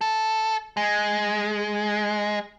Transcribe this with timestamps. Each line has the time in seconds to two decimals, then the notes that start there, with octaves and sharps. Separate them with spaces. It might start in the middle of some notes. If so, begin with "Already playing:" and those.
0.01 A4
0.77 G#3